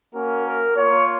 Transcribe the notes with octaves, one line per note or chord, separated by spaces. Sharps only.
A#3 C#4 F#4 A#4
A#4
A#3 F4 C#5